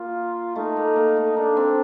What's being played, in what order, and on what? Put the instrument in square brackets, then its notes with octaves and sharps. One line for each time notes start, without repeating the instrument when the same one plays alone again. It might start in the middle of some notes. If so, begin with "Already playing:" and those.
Already playing: [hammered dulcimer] A#3 [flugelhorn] F4
[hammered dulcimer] A3 [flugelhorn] D#4
[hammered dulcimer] A#3
A#3
A3
[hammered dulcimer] A#3 [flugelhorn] D4
[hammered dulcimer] C4